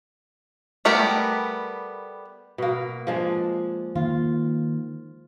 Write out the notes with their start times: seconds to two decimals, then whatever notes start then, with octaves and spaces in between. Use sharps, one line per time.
0.85 G3 A3 B3 G4 A#4
2.58 B2 A#3
3.07 F3 G#3 D4
3.95 D#3 A#3 F4